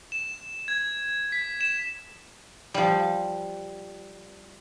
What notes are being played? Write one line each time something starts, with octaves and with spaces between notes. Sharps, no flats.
E7
G#6
B6
E7
F3 G3